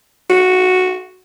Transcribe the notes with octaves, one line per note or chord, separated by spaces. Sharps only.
F#4